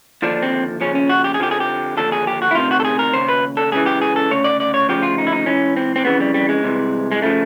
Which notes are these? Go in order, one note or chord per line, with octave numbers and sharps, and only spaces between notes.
D#2 D3 F3 D4
C4
D#2 C#3 F3 C#4
C#4
F#4
G4
G#4
F2 D3 F3 G4
G#4
G4
D#2 D3 F3 A4
G#4
G4
F#4
E4
D2 C3 D#3 F4
F#4
A4
G#4
A#4
D#2 C#3 C5
B4
A4
C#2 C#3 E3 G#4
G4
G#4
A4
D2 C#3 C#5
D5
D5
C#5
D2 C#3 F3 G4
F4
D#4
E4
D#4
G#2 E3 C#4
C4
C4
F2 C#3 E3 B3
G3
G3
G#3
C2 C3 E3
G#3
C#3 F3 A3